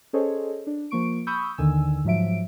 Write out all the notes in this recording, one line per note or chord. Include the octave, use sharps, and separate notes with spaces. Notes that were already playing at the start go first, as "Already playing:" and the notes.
C#4 G#4 A4 C5 C#5 D#5
D4
F3 A#3 C#6 D7
B5 C#6 D#6 E6 G6
D#2 D3 D#3 G#5 E6
G#2 F3 F#3 E5 D7